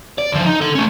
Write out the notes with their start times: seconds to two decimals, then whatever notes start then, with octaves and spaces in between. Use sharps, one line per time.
0.18 D5
0.32 D2 F3
0.46 D#4
0.61 A4 F#5
0.75 A3 C#4